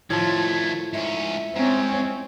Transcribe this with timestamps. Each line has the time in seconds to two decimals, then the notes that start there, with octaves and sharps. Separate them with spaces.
0.10 A2 D#3 F3 A3 G#6
0.94 G#2 C#4 E5
1.55 G#2 C4 C#4